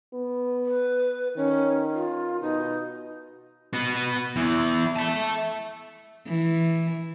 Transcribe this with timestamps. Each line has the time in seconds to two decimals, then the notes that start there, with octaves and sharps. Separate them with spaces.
0.14 B3
0.66 B4
1.37 D#3 C#4
1.94 F4
2.42 B2 D#4
3.73 B3 F#4
4.36 E2 E3
4.96 E5 A5
6.27 E3